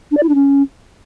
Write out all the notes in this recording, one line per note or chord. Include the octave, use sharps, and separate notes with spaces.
D4
D5
E4
D4
C#4